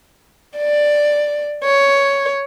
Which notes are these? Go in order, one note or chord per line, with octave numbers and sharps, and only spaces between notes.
D5
C#5